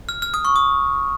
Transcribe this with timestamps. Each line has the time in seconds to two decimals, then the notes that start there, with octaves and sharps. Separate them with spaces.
0.09 F6
0.22 F6
0.34 D#6
0.45 C#6
0.56 D#6